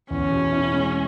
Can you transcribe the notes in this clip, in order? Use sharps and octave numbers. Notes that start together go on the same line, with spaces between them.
E2 C#4
B2
E4
G#3